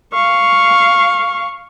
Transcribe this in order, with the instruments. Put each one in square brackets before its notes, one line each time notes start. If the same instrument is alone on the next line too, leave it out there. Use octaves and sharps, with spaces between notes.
[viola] F5 C#6